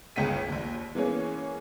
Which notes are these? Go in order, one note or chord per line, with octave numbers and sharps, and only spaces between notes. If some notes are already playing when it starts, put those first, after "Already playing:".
G1 C#2 C#3 G5 B6 D#7
A#1 D#2
E3 G#3 A#3 B3 C#4 G#4